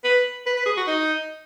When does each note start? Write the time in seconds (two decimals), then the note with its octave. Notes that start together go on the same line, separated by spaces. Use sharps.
0.04 B4
0.46 B4
0.57 B4
0.66 G#4
0.77 F#4
0.87 D#4